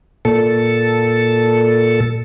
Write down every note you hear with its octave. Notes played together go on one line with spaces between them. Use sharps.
A#2 A4